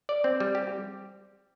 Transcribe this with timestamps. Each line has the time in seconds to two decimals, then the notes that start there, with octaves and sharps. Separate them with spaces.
0.09 D5
0.24 C4
0.40 G3
0.55 G4